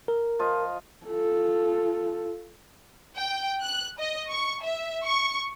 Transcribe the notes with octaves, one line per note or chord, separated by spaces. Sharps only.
A#4
F3 F4 D#5
F4 A4
G5
F#6
D#5
C#6
E5
C#6